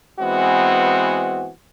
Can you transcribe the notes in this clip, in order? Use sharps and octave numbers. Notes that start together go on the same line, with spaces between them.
E3 G#3 B3 C4 F#4